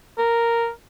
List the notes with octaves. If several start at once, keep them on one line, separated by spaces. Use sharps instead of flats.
A#4